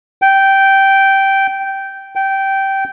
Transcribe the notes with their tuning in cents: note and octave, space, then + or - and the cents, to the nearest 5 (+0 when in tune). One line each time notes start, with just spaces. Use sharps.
G5 -10
G5 -15